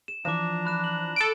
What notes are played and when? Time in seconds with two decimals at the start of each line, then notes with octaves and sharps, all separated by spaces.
0.08 E7
0.25 E3 F3 D4 A#5 D6 E7
0.65 B5 F#6 E7
0.84 F#7
1.16 A4 D7